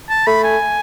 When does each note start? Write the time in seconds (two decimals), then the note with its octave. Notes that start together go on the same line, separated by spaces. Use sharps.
0.10 A5
0.27 A3 B5
0.44 G#5